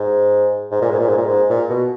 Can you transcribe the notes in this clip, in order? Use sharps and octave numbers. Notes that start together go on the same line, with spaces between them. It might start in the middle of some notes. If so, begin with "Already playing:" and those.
Already playing: G#2
G#2
A#2
G#2
A#2
G#2
A#2
G#2
A#2
B2